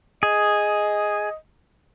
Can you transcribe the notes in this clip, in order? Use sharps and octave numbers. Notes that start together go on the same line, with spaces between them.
G#4 D#5